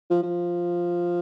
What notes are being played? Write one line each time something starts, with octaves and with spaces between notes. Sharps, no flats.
F3
F3